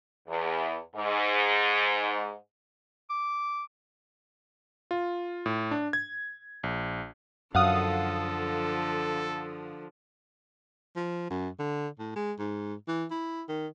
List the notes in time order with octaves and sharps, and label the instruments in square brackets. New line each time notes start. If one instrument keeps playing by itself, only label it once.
[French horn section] E2
G#2
[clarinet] D6
[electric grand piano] F4
A2
D4
G#6
A#1
[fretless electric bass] F#2 [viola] D3 F3 [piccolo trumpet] A4 [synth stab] F5 F#5 D#6
[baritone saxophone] F3
F#2
D3
A2
G#3
G#2
E3
E4
D#3